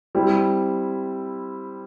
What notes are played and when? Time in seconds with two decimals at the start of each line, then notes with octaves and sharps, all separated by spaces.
0.15 G3 C4 E4